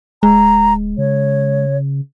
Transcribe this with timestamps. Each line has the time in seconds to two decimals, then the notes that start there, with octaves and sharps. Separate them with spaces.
0.23 D1 G#3 A#5
0.98 C#3 C#5